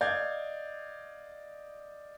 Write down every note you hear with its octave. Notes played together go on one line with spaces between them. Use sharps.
D5 D#5 F5 G6 G#6